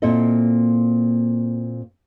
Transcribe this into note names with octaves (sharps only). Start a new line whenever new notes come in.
A#2 A#3 C4 E4 A4 D#5